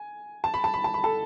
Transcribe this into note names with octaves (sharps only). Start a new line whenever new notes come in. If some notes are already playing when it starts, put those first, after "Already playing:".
Already playing: G#5
A5
B5
A5
B5
A5
B5
A4 A5